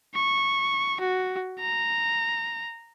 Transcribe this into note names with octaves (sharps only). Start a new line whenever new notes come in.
C#6
F#4
A#5